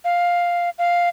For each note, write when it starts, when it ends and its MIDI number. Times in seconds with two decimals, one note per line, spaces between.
0.04 0.70 77
0.78 1.09 77